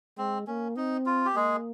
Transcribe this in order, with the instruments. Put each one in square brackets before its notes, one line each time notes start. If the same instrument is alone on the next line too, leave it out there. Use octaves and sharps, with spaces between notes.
[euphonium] G#3 [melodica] C4
[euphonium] A#3 [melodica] C#4
[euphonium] C4 [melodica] D#4
[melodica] F4
G4
[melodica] G#3 G#4 [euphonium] A#3